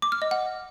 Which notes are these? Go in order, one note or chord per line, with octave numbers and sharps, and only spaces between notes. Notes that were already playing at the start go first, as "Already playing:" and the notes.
D6
F6
D#5
F#5